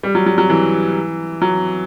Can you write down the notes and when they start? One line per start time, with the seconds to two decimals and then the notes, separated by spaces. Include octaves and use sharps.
0.03 G3
0.15 F#3
0.26 F#3
0.38 F#3
0.50 E3
1.42 F#3